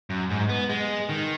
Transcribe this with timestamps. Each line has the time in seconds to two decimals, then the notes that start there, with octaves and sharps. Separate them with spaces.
0.10 F#2
0.30 G#2
0.49 B3
0.70 G#3
1.09 D#3